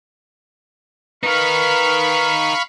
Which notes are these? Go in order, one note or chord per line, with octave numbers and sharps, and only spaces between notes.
D#4 A#4 B4 F5 B5 C#6